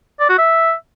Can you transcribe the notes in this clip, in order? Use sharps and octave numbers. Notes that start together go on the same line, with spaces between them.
D5
F#4
E5